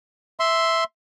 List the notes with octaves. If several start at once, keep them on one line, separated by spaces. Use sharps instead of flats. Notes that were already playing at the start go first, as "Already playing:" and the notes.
E5 C6